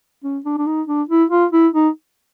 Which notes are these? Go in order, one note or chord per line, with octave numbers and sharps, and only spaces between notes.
C#4
D4
D4
D#4
D4
E4
F4
E4
D#4